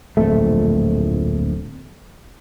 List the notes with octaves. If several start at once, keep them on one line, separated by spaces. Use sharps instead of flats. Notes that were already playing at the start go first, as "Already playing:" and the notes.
D1 A#1 F2 A3